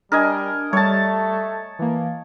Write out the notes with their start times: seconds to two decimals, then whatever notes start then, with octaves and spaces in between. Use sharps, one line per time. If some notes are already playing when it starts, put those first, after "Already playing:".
0.12 G3 D4 A#4 D#5 G#5
0.73 G3 A3 C#5 A5
1.79 E3 A#3